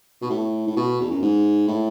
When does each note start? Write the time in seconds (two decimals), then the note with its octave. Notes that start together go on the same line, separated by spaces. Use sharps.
0.22 B2
0.30 A2
0.67 A2
0.76 B2
1.00 E2
1.11 F#2
1.22 G#2
1.68 A2